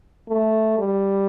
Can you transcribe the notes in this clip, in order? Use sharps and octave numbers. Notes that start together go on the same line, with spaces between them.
A3
G3